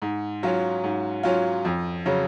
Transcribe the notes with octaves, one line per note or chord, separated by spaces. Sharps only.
G#2
F#3 C#4 F4
G#2
F#3 C#4 F4
F2
C#3 F#3 C#4